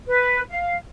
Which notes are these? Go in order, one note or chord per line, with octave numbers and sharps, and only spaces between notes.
B4
F5